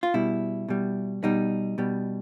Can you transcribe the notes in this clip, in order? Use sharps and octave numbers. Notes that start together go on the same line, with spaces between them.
F4
B2 G3 E4
B2 G3
B2 G3 D#4
B2 G3